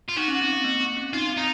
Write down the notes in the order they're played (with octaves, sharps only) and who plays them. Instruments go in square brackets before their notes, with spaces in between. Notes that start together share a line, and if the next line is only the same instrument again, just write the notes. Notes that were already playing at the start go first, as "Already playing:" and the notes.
[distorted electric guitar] F4
[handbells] D#4 [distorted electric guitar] F#4
[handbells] C#4
C4
C4
A#3
C4
C#4
[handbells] D#4 [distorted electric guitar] F4
[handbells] C4
[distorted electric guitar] D#4